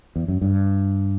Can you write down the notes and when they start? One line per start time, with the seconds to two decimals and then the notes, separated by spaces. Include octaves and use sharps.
0.16 E2
0.28 F#2
0.41 G2